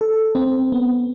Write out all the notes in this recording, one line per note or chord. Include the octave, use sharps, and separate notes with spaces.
A4
C4
B3